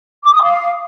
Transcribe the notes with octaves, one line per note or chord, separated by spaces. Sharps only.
D6
D#6
F5